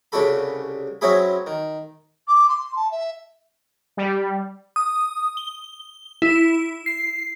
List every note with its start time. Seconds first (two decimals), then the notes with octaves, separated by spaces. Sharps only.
0.12 C2 C#3 D4 F#4 A4 B5
1.01 F#3 C4 C#4 E4 G#4 B5
1.46 D#3
2.27 D6
2.48 C6
2.76 A5
2.91 E5
3.97 G3
4.76 D#6
5.37 G7
6.22 E4
6.86 C7